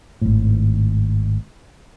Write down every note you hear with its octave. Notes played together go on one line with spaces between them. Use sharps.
G#1 A2